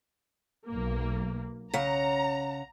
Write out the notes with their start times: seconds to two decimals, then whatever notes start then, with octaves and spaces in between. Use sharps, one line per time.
0.66 B1 A#3
1.74 C#3 F#5 A#5